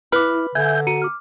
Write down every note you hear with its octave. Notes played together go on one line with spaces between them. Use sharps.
E4 B4 D6 F6
D3 E5 G#5 G6 G#6
F#4 A#5 C#7 D#7
D6 F6